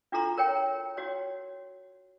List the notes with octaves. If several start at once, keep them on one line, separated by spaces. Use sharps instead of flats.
D4 F4 F#4 A4 A#5 C6
A#4 C#5 G5
F#4 C#5